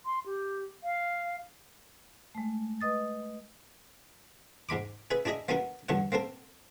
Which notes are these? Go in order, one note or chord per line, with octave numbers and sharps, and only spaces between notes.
C6
G4
F5
G#3 A3
B4 D#5 D#6 A6
G#2 G#3 B5 D6
G#4 B4 E5
D4 E4 G#4 D#5 E5
A#3 B3 C#4 E4 F#4 A#4
E2 G2 D3 C#5 F#5
A#3 C4 A4 A#4